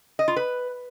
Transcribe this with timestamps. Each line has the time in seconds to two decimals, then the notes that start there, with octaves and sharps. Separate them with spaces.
0.19 D#5
0.28 F4
0.36 B4